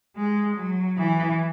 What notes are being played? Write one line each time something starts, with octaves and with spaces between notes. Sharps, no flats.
G#3
F#3
E3